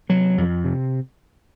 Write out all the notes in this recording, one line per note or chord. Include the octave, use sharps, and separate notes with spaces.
C3 F#3
F2
C3